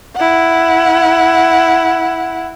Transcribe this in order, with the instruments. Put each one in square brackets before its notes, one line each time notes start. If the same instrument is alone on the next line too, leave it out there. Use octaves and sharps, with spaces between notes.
[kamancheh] E4 F#5